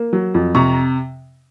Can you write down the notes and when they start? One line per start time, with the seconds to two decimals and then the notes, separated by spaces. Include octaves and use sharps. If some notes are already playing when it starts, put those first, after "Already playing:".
Already playing: A#3
0.13 F#3
0.35 F2
0.55 C3 A#5 C#6